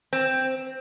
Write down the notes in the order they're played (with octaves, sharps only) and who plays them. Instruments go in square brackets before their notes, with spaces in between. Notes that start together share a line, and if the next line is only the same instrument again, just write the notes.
[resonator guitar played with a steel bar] C4